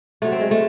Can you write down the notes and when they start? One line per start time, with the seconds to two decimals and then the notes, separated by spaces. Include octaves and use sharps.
0.22 C3 F#3 A3
0.32 C4
0.41 G#3
0.51 A3